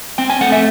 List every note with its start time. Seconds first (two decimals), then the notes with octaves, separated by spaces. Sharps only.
0.18 C4 G5
0.30 G#5
0.41 A3 F#5
0.52 E5